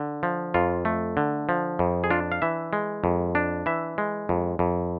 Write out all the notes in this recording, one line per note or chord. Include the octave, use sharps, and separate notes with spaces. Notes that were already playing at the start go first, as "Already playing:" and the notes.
Already playing: D3
F3
F2 F4
A3
D3
F3
F2
G#4
D4 F4
F5
E3 E5
G#3
F2
D4
E3 E5
G#3
F2
F2